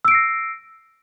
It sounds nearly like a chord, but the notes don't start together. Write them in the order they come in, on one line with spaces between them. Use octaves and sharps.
E6 D7 C7 A#6